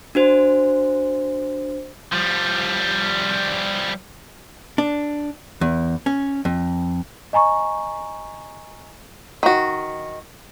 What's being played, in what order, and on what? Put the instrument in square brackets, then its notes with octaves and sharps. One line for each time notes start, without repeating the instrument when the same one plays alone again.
[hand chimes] D4 F#4 C5
[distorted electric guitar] F3 G3
[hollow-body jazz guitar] D4
E2
C#4
F2
[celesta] D#5 G#5 A#5 C#6
[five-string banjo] D#3 F#4